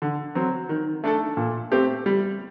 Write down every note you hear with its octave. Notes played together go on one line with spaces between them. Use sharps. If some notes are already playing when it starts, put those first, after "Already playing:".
D3
F#3 C4
D#3
A3 D4 A4
A#2
A3 C4 G4
G3